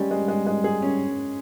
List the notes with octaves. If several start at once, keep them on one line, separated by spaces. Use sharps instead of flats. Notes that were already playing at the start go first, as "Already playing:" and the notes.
Already playing: G3 G#3 C#4
G#3
G#3
G#3
G#4
C#4